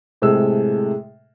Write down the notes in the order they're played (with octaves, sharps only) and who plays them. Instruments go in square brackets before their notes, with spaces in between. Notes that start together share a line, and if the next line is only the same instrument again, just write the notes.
[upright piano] A2 C3 G#3 A4 E6